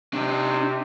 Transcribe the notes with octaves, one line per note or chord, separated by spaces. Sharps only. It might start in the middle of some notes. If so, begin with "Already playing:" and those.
C3 D4 D#4